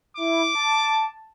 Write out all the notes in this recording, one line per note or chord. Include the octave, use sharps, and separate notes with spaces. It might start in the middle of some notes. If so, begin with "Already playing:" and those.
E4 D6
A5